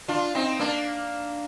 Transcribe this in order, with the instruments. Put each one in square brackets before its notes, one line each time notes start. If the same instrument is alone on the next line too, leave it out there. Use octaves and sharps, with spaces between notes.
[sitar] D4 F4
C4 D#4
A#3 D4